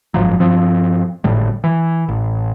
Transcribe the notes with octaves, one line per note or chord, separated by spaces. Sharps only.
F#1 G#2 F3 F#3
G2 F3 C4
G#1 A2 D3 G3
E3
A1